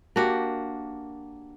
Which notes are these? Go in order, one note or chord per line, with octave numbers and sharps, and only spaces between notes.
A#3 D4 F#4 G4